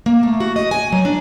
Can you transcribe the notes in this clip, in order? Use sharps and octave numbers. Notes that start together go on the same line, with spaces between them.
A#3
A3
F#4
D#5
G#5
F#3
D4